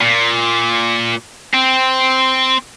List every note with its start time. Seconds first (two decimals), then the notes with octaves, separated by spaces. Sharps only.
0.01 A#2
1.54 C4